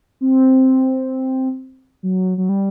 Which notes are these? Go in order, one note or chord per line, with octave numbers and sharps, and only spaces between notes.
C4
F#3
F#3
G3